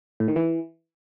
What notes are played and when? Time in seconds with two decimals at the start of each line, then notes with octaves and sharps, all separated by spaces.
0.20 A2
0.28 D#3
0.36 E3